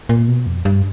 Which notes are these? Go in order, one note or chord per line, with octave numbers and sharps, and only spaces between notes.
A#2
B2
F2
G2